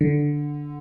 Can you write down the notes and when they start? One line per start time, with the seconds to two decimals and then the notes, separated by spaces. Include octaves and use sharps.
0.01 D3